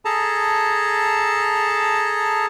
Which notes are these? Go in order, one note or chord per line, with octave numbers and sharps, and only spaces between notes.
G#4 A4 A5 A#5